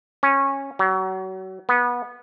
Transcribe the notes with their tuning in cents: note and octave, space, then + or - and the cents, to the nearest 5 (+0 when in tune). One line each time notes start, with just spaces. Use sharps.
C#4 -15
F#3 +30
B3 -20